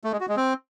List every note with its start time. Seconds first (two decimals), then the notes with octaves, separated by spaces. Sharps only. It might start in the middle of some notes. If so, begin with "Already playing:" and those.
0.04 A3
0.12 G#3
0.20 F#4
0.29 G#3
0.37 C4